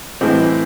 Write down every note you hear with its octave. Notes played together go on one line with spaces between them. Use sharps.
A2 E3 G#3 C4